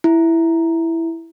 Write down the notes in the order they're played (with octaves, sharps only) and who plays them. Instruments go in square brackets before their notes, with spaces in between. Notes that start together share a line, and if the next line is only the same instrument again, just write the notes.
[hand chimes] E4